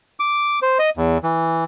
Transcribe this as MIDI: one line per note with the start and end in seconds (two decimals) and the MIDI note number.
0.20 0.59 86
0.62 0.78 72
0.79 0.90 75
0.97 1.18 40
1.24 1.64 52